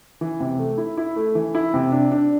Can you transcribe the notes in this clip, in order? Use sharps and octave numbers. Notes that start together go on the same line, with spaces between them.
E3
C3
A3
E4
E4
A3
E3
E4
C3
D4
D4